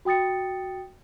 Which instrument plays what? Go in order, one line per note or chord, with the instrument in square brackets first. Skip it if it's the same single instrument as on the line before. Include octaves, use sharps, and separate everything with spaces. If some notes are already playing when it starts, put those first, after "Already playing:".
[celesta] F#4 G5 D#6 A6 C#7